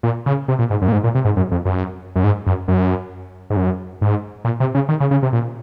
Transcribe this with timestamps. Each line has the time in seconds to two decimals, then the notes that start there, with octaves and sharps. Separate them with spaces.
0.03 A#2
0.26 C#3
0.48 C3
0.59 A#2
0.70 G#2
0.82 F#2
0.88 A#2
0.92 G#2
1.04 A#2
1.15 C3
1.25 G#2
1.37 F#2
1.51 F2
1.65 F#2
2.16 F#2
2.24 G#2
2.46 F#2
2.68 F#2
3.50 G#2
3.57 F#2
4.01 G#2
4.45 A#2
4.60 C3
4.75 C#3
4.89 D#3
5.00 C#3
5.11 C#3
5.23 C3
5.33 A#2